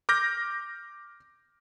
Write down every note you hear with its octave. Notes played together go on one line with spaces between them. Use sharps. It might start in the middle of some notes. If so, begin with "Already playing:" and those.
D6 F6 G6 A#6